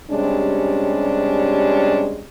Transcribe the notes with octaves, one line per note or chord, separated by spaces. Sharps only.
C3 G3 G#3 C#4 D4